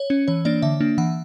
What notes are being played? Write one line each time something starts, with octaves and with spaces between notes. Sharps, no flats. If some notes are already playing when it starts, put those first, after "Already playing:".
Already playing: C#5
C#4
E3 C#5
A#3 D4 D5
D3 E5
A#3 D4
E3 F#5